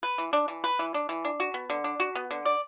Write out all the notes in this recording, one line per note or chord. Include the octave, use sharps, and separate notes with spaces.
B4
E3
D4
E3
B4
E3
D4
E3
D4
F#4
B3
D3
D4
F#4
B3
D3
D5